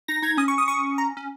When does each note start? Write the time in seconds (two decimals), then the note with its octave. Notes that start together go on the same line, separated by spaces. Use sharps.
0.08 D#4 A#6
0.22 D#4 G#6
0.37 C#4 D#6
0.48 C#6
0.58 D#6
0.68 C#6
0.98 A#5
1.17 C#4